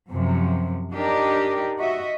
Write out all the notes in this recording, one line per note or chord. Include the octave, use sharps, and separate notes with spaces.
F#2 C3 F3
D4 D#4 G4 A#4
F#4 D#5 E5